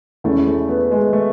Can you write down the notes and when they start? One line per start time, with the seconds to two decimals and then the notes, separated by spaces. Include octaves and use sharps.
0.24 E2 C#3 G#3 A3 C#4 E4
0.47 A3
0.69 B3
0.91 G#3
1.13 A3